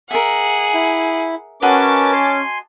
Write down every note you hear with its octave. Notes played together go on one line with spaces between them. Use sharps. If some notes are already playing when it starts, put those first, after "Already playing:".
G#4 A#4 E5 F#5
E4
C#4 F#4 G#4 A#4 B4 D#5 A5 D6
G#5 C6